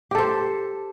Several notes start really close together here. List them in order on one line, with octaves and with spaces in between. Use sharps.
G4 A4 C5